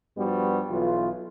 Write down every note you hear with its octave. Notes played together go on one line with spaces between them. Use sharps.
G2 F3 G3 B3 F#4
B1 E3 F4